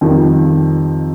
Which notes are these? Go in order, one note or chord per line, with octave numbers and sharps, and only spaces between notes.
F2 D#3 G3